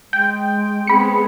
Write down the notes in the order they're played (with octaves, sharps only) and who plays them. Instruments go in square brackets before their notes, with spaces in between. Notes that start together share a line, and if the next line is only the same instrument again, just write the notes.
[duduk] G#3 [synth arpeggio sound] G5
[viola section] G#3 B3 G#4 [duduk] C4 [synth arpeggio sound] B5 C#7